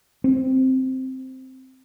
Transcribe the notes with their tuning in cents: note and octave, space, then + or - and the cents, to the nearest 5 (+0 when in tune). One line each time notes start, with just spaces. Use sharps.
C4 +0